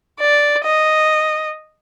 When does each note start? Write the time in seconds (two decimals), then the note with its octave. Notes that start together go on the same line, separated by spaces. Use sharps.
0.20 D5
0.65 D#5